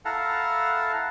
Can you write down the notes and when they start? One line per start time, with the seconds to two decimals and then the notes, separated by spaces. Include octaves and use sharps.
0.05 E4 A4 F5 F#5 A5 A#5